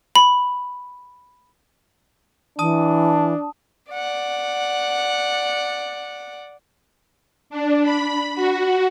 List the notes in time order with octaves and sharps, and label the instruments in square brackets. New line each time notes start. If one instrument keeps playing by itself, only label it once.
[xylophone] B5
[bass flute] E3 [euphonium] D4 [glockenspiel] A5 D#6
[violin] D5 F#5
[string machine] D4
B5
F#4